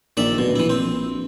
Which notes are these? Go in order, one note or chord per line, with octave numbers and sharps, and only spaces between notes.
A#1 D#3 D5 E5
D1 B2
E3 E4
A#1 C4